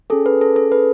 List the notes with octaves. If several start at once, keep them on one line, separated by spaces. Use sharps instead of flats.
C#4 G#4 A4
B4
A4
A4
B4